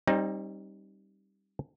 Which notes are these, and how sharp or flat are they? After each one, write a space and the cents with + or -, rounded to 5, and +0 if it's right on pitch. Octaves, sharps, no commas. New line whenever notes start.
G3 +0 C4 +40 D#4 +0